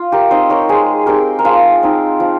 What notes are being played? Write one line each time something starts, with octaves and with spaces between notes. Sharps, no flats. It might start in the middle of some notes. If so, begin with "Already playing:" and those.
Already playing: F4
G4 A#4
C4 D#4 C5 D#5
A#4 C#5
G#3 G#4 C5
C4 D#4 G4 A#4
A#4
F3 F4 G#4
C4 D#4
F3